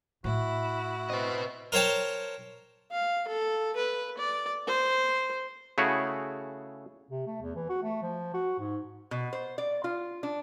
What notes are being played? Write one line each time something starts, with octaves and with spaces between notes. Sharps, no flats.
A2 E4 F#4
C4 E4 B4 D#5
A#4 C5 C#5 G5 A5
F5
A4
B4
D5
C5
C#3 A3 E4 F#4 G#4 C#5
C3
A3
E2
E3
F#4
A3
F3
F#4
G#2
B2
C5
D5
F4
D4